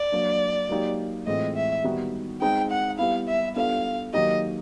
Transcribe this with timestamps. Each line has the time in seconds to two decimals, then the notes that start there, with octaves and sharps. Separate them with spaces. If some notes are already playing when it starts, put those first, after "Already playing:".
Already playing: D5
0.12 F#3 A#3 D4
0.69 F#3 A#3 D#4 G4
1.26 A2 E3 G#3 C4 F4 D#5
1.56 E5
1.84 D#3 G3 B3 D#4 F#4
2.42 G#3 C4 D#4 G5
2.71 F#5
2.98 G3 B3 E4 F5
3.28 E5
3.56 G3 B3 D4 F4 A4 F5
4.13 D#3 F#3 A#3 D#4 G4 D#5